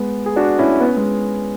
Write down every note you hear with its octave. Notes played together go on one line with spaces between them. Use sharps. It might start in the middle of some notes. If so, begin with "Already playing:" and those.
Already playing: G#3 B3
G#4
D4 F#4
C#4 E4
B3
C#4
G#3 B3